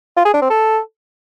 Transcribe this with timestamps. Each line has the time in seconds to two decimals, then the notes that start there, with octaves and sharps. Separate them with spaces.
0.17 F4
0.25 G#4
0.34 D4
0.42 C4
0.50 A4